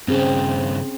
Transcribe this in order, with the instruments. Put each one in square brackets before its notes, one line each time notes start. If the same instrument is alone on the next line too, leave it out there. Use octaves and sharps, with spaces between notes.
[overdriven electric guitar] G2 C#3 [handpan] C4 C#4 G#4